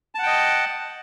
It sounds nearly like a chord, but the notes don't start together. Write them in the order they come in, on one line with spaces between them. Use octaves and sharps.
A5 F#5 G5 D#5